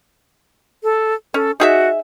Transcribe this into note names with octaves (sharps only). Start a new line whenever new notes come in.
A4
C#4 A4
D#4 F#4 G#4 E5